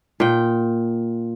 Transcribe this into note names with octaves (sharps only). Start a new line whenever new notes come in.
A#2 G5